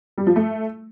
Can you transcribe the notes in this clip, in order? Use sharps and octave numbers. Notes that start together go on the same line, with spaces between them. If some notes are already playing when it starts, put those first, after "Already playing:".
G3
F3
A3